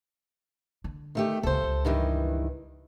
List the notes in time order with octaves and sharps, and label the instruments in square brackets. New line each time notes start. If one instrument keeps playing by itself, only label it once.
[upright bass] D3
[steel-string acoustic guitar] D#3 A3 G4
[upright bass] C#2 C#3 [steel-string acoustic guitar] A4 C5
[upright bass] C#2
[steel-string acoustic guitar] G2 D#3 E3